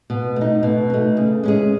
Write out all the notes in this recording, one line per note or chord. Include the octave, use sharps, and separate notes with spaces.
B2
A3 D#4
B2
A3 D#4
C#3
G#3 C#4 G#4